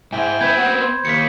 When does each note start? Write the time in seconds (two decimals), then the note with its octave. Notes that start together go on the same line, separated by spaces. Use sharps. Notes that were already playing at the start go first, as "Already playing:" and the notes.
0.12 G#2 E4 G5 G#5
0.41 B3 C4 B5 G6 G#6
0.56 F#4 F#5
0.79 C5
1.05 D#2 B6 C#7